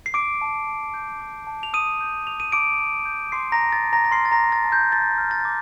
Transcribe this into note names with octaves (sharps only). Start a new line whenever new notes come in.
C7
D6 D7
A5
A5
G6
D6
A5
F7
A5 D#6 D#7
G6
D6 F7
D#7
A5 D6 D7
A5
G6
C6 D6 C7
A#5 A#6
A5
A6
A5
A#5 A#6
A#6
C6 F6 C7
A6
A#5 A#6
D6
A6
A5
G6
A5 A6
F6
A6
D6